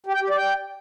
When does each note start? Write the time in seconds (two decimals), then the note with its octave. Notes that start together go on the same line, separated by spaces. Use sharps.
0.06 G4
0.14 G5
0.22 G4
0.30 D5
0.37 G5